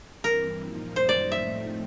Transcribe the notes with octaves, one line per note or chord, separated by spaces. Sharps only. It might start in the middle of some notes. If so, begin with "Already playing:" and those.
G2 E3 G3 C4 A#4
A#2 F3 A#3 D#4
F#2 D#3 G3 A#3 D#4 C5
D5
A2 F3 A3 C4 D#4 E5